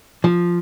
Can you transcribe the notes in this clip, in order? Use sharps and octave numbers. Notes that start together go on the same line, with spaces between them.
F3